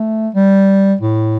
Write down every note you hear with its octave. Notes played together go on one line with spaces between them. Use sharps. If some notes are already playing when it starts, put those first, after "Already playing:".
Already playing: A3
G3
A2